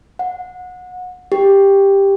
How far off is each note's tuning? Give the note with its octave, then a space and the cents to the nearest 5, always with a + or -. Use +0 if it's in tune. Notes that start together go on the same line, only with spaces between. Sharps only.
F#5 -25
G4 +10